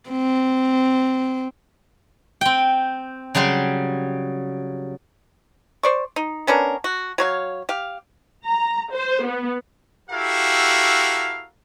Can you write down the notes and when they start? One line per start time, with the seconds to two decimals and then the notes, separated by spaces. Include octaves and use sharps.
0.10 C4
2.41 C4 G5
3.35 C#3 F#3 G3 C5
5.83 C5 D5 C#6
6.16 D#4
6.47 B3 C#4 D4 A#4
6.84 F#4
7.18 F#3 C#5 F5
7.69 G4 F5
8.45 A#5
8.92 C5
9.24 B3
10.10 E4 F#4 G4 A4 A#4 F5